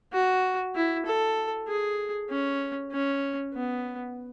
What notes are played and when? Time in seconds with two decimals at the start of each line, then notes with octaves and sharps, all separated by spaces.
0.13 F#4
0.75 E4
1.06 A4
1.68 G#4
2.30 C#4
2.92 C#4
3.54 B3